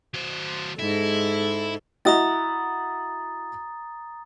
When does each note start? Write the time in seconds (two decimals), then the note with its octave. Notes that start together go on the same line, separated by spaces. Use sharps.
0.14 F#3 C5
0.79 G#2 G#3 E4 A4
2.05 E4 F#4 D#5 A#5 D#6 A6